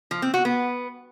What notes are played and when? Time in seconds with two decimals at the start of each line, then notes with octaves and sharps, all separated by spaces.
0.11 F3
0.22 C4
0.34 F#4
0.45 B3